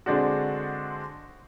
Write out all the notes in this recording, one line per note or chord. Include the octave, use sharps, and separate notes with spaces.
D3 G#3 C4 D4 F#4